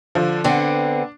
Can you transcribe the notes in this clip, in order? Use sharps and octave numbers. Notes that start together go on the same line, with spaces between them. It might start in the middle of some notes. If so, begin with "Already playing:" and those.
D3 F3
D3 B3 C4 D4